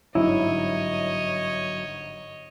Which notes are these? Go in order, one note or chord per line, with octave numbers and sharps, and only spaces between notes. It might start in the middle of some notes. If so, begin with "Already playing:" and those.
G1 G#2 F#3 E4 C#5 D#5